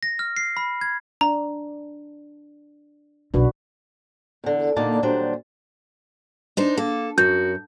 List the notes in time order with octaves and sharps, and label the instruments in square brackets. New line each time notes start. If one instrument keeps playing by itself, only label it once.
[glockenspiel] A#6
F6
C7
B5
G#6
[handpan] D4 [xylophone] A#5
[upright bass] B1 [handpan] D4 F#4 B4
[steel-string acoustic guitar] E2 D3
A#2 D3 A#3 D#4 D5 A5
D#2 A#2 F#3 G3 D4 C5
D4 D#4 C5
[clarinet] A#3 [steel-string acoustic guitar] A4
[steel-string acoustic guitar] F#2 [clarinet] F#4 [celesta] G6